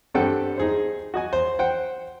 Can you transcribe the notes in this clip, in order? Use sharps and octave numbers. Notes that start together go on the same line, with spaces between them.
G2 G3 C4 A4 F#5 G5
D#4 G#4 C5
F#4 D#5 G#5
C5
C5 F#5 G5